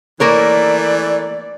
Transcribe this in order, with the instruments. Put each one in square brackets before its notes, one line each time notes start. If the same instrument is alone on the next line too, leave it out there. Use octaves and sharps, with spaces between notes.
[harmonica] E3 A3 [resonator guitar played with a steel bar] A#3 A#4 C#5 [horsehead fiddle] D5